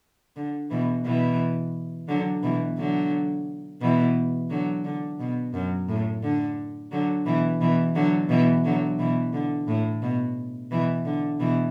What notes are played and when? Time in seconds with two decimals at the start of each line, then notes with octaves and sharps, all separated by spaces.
0.36 D3
0.70 B2 E3
1.05 B2 E3
2.08 D3 F#3
2.43 B2 E3
2.78 D3 F#3
3.81 B2 E3
4.50 D3 F#3
4.85 D3
5.20 B2
5.54 F#2
5.89 A2
6.23 D3
6.91 D3 F#3
7.26 B2 E3
7.61 B2 E3
7.95 D3 F#3
8.29 B2 E3
8.64 D3 F#3
8.99 B2 E3
9.33 D3
9.68 A2
10.02 B2
10.71 B2 E3
11.05 D3
11.40 B2 E3